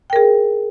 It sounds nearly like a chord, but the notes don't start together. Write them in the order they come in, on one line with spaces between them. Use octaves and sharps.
G5 A#4 G#4